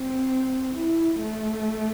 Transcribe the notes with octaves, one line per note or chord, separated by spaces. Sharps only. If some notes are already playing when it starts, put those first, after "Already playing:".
Already playing: C4
E4
A3